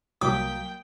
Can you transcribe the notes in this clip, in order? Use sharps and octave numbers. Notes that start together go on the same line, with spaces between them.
C2 F#3 A#3 G5 D#6 B6